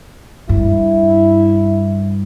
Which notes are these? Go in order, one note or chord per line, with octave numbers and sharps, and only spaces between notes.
G2 E4